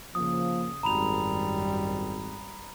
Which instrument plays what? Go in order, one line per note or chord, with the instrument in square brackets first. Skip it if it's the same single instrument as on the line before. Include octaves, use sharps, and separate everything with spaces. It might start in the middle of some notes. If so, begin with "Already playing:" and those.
[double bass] C#3 [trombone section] F3 A#3 [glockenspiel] D#6
[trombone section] G#1 [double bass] F#2 G3 [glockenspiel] A#5 B5 F7